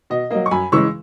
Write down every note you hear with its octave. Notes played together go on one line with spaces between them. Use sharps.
B2 D#5
F#3 A#3 D#5
C#6
F#2 G#5 B5
C#3 E3 G#3 C#6 E6